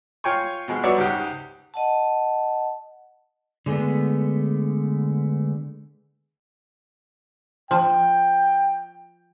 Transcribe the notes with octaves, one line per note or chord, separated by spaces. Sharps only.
F4 C#5 G5 G#5 C#6
B2 F3 G#3
F#3 G3 B3 C#5 D5 E5
C#2 G#2 G4 F#5 D#6
D#5 F#5 A5
D3 G#3 A3 B3
F3 G5